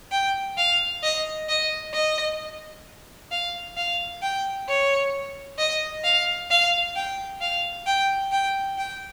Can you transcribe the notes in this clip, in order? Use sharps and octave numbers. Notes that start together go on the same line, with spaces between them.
G5
F5
D#5
D#5
D#5
F5
F5
G5
C#5
D#5
F5
F5
G5
F5
G5
G5
G5